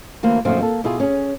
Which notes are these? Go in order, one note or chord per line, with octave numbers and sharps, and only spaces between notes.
D2 E3 A#3 C5
F#2 A#2 D#3 F3 A3 C4
A#3 A4
B2 E4 F4 G#4
C#4 G#4